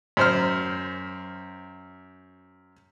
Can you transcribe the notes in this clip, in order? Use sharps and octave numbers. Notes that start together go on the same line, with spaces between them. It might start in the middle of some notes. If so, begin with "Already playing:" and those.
F#2 C5 F6